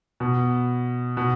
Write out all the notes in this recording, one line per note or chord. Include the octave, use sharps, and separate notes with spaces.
B2
B2